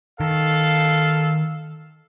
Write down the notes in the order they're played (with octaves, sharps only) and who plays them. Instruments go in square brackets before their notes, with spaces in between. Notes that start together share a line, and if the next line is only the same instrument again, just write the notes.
[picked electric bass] D#3 [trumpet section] A4 F5